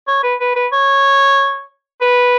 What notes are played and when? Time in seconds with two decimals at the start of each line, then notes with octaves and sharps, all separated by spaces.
0.08 C#5
0.24 B4
0.40 B4
0.56 B4
0.72 C#5
2.02 B4